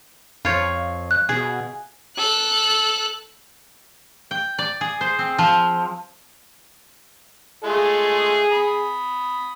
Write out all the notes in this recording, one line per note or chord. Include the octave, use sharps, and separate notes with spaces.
F2 F4 C#5
F#6
B2 G#4
A4 F#6
G5
D5
G#4
C5
C4
F3
G#3 A3 F4 G#4
B5 D#6